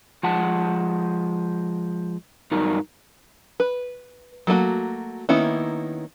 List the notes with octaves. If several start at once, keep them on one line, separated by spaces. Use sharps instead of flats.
F3 G#3 F#5 A5
G2 F#3 D#4 A#4
B4
F#3 A3 A#3 F#4
D#3 A#3 B3 C#4 E4